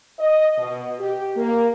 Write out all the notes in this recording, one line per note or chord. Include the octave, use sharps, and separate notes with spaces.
D#5
B2
G4
A#3